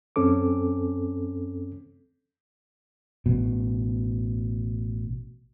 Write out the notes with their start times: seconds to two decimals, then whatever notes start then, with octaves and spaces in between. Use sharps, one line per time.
0.16 F#2 C4 C#4 A4 D6
3.26 A1 B2